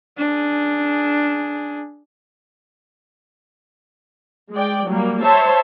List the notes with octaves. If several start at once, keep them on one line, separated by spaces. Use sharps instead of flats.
D4 G#4
G#3 D5 G5
F#3 G3 A#3
C5 C#5 E5 A5